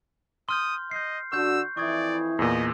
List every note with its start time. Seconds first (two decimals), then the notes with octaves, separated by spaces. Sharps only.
0.49 C6 D#6 F6 G6
0.91 D#5 G6 C7
1.32 D3 D4 F#4 C#6 E6 G6
1.77 F2 E3 E4 D5 C#6 D#6 G#6
2.39 E2 A#2 D#5